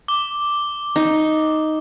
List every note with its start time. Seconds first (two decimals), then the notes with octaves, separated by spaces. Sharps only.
0.08 D6 G7
0.96 D#4